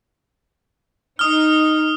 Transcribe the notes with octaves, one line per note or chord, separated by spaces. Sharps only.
D#4 D#6 F6